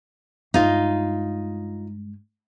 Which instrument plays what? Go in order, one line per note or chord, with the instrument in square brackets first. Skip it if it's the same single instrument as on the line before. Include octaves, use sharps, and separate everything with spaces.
[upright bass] G2 G#3 [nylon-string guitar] D#4 F4